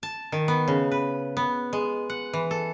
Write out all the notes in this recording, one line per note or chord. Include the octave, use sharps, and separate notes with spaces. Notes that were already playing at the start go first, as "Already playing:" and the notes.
A5
D#3
B3
C#3
B4
B3
G#3
F#5
E3
A4